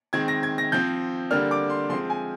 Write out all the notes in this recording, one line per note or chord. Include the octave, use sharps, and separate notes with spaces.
D#3 G#3 C4 G#6
A#6
G#6
A#6
F3 C4 G6
D3 G3 A#3 D4 F6
D6
C6
F3 G#3 C4 C6
G#5